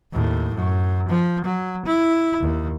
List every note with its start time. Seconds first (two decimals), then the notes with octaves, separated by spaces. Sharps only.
0.13 D#2 A2
0.54 F#2
1.09 F3
1.44 F#3
1.86 E4
2.41 D#2